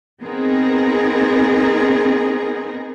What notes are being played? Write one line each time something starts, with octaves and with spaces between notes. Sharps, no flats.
B3 C4 D#4 G#4 A#4